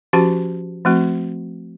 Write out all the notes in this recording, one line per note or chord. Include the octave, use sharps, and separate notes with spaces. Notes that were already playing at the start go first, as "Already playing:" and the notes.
F3 C#4 F#4 G4 A5
F3 A3 C4 F#4